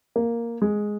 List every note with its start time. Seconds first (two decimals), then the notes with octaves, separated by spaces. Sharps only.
0.16 A#3
0.62 G#3